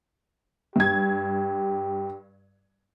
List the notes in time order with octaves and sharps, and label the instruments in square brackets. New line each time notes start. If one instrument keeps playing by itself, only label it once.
[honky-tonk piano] G2 G#6 [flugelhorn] G4